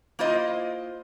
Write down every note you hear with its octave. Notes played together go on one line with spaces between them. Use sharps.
A#3 E4 F4 C5 D#5